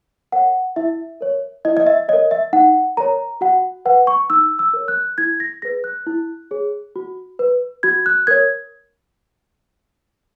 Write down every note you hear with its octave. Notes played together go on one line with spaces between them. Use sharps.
A#4 C#5 F#5
E4 E5
A#4 C#5
E4 D#5
D#5
E5
A#4 C#5 D#5
E5
D#4 F#5
A#4 C#5 A#5
F#4 F#5
B4 F#5
C#6
D#4 E6
E6
A#4 C#5
F#6
E4 G#6
A#6
G#4 B4 A#6
F#6
E4
G#4 C#5
F#4
B4
F#4 G#6
F#6
A#4 C#5 G#6